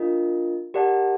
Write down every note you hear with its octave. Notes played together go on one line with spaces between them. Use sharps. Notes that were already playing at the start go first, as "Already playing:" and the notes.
Already playing: D4 F4 A#4 D#5
G4 A#4 D5 F#5 A5